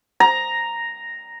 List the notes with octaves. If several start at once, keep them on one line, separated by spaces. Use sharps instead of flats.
A#5